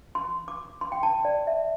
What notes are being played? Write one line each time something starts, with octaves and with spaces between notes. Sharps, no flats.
C6
D6
C6
G5
A5
D5
E5